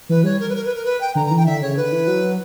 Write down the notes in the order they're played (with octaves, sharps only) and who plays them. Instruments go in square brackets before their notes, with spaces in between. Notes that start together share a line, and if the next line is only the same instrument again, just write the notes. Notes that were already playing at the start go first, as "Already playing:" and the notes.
[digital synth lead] E3 [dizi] B4
[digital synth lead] G3 [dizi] C#5
[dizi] A#4
B4
A#4
B4
A#4
B4
G5
[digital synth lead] D3 [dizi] A#5
[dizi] A#5
[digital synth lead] E3
[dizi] G5
[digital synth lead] D3 [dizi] E5
[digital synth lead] C#3 [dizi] C#5
[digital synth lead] D3 [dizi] B4
[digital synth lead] E3
F#3